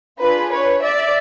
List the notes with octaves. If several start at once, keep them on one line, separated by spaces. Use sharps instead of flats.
D4 F4 G#4 B4
B4 C#5
D5 E5